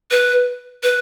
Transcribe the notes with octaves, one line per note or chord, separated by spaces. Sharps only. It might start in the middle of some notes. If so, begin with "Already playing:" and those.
B4
B4